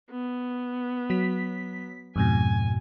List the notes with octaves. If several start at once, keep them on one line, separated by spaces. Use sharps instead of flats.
B3
F#3 B6
F2 G#2 B2 G#5